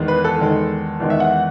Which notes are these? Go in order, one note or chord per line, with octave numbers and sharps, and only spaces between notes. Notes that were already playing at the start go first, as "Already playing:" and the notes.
Already playing: E2 D#3 G#3
B4
A4
E2 D#3 G#3
E2 D#3 G#3
E5
F#5